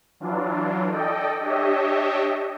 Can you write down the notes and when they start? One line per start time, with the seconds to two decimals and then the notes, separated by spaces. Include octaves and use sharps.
0.20 E3 F#3 D4 F4
0.88 A4 D5 D#5 G5
1.40 D4 G4 C#5 D#5 E5